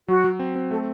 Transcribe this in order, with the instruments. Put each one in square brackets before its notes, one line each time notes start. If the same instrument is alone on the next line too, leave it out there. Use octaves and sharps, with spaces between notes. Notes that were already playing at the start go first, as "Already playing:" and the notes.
[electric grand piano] F#3 [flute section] F#4
[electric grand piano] F#3
C4
C4
[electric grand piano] A3 [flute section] A4